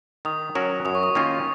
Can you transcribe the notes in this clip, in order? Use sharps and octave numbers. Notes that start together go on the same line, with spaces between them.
D#3 D#6
F#3 C#4 F#4 A#4
F#2 D#6
C#6
D#6
D#3 A#3 C#4 F4